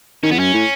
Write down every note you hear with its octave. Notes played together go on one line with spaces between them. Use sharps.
D#3 C#4
E2 B3
F#2 C#4
A2